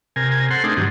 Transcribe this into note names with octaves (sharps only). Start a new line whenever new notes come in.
C3 A#4 G#5
A4 C5 F#5 C6
A3 C4 D4 D#4 G#4 A#4
G2 D#3 F#3